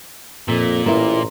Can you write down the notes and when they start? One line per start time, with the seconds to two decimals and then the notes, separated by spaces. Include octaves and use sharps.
0.48 F2 A#2 A#3 B6
0.86 A1 A#3 E4 A#5 C6